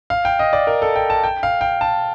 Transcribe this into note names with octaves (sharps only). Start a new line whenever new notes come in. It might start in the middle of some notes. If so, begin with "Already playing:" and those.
F5
G5
D#5
D5
A#4
A4
G5
A5
G5
F5
G5
A5